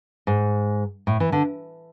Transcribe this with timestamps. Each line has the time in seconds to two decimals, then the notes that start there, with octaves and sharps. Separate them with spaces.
0.27 G#2
1.07 A2
1.20 E3
1.32 D3